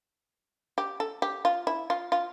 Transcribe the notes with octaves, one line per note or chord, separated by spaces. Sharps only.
G4
A4
G4
F4
E4
F4
F4